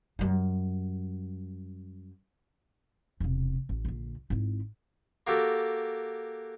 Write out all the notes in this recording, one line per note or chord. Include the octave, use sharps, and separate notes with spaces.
F#2 G3
E1 C3
A1
A#1 D3
G#1 E4
A#3 F#4 G4 A4